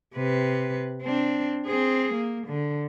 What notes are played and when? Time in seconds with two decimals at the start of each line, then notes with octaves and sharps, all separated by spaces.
0.15 C3 B4
1.02 C4 D4
1.66 C4 G#4
2.13 A#3
2.47 D3